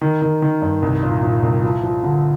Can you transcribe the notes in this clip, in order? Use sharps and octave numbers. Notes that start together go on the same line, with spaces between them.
D#3
D#3
D#3
G2
C2
A#2
A#2
C2
F3
F3
D3